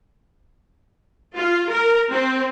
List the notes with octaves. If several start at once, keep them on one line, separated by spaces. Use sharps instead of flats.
F4
A#4
C4